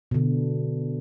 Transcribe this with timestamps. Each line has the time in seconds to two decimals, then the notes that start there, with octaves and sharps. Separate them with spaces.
0.11 B2 D3